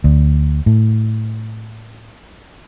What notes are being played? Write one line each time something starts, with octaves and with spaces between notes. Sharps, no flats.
D2
A2